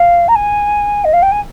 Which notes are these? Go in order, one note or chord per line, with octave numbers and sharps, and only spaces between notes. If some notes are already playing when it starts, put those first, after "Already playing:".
Already playing: F5
A#5
G#5
D#5
F5
G5
G#5